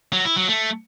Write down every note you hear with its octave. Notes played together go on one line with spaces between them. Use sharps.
F#3
E4
F#3
A3